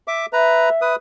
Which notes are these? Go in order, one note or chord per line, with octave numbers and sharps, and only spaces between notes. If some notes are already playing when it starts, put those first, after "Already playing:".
E5 D6
B4 E5 A#5
B4 D#6